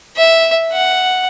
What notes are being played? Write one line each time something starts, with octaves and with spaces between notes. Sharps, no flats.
E5
F#5